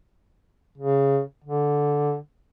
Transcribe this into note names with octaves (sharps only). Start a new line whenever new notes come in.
C#3
D3